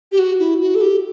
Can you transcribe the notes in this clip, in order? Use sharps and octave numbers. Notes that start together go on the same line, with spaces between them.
G4
F#4
E4
F#4
A4
G4